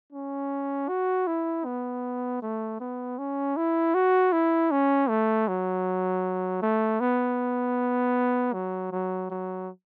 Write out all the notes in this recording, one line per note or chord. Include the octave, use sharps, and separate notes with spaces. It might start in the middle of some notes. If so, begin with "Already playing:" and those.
C#4
F#4
E4
B3
A3
B3
C#4
E4
F#4
E4
C#4
A3
F#3
A3
B3
F#3
F#3
F#3